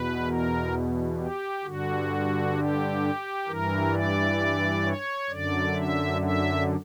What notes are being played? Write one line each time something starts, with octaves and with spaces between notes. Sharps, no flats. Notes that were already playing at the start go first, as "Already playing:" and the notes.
Already playing: E2 B2 B4
A#4
G4
G2 D3 F#4
G4
G2 E3 A#4
D5
C#5
F#2 D3 D5
E5
E5